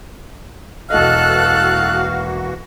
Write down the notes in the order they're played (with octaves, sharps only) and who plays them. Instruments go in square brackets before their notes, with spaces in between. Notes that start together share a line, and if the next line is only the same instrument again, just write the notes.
[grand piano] E1 D#5 [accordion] E3 A#3 F#4 [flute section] A4 F#6 [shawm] F5